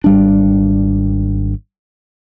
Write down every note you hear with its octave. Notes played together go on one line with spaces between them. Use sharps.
G#1 G3 D4